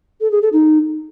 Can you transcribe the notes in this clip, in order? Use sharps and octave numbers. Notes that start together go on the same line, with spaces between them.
A4
G#4
A4
D#4